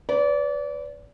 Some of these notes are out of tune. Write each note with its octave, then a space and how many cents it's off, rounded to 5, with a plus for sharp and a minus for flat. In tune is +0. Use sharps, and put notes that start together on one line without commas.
B4 +25 D5 -30